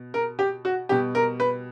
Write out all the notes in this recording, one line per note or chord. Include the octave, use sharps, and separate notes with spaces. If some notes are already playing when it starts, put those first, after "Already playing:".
Already playing: B2
A#4
G4
F#4
B2 G3 G4
A#4
B4